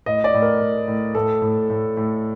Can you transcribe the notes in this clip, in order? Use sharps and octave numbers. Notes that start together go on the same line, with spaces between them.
A2 D#5
D5
A2
A#4
A2
A2
A2 A4
A2
A2
A2